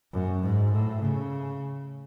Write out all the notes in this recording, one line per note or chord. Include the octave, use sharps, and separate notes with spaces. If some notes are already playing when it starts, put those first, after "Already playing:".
F#2
G#2
A2
C#3